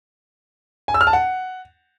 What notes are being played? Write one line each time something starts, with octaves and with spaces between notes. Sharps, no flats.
G#5
E6
F6
A5
F#5